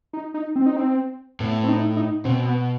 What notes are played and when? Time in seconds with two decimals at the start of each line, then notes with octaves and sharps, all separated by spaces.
0.13 D#4
0.34 D#4
0.56 C4
0.66 D#4
0.76 C4
1.40 A2 B3
1.63 C4
1.69 D#4
1.97 D#4
2.25 B2 C4
2.39 C4
2.46 B3